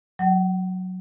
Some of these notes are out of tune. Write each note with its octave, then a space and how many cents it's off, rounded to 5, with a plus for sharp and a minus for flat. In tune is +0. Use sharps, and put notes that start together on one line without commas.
F#3 -5 F#5 +45